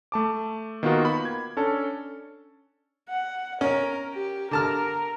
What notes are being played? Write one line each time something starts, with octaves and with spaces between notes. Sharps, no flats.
A3 A5 D6
D#3 A#3 B3 F4 F#4 A#4
B5
G#6
C#4 D4 A4
F#5
C#4 A#4
G4
D3 A#4 A5 F6